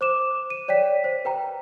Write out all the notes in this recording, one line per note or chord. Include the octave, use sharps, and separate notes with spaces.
C5 D6 E7
D#7
C#5 D5 G5 B6
C5
B4 G5 A#5